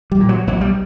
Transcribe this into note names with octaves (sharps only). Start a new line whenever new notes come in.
G3
A#2
F#3
B1 F#3
G3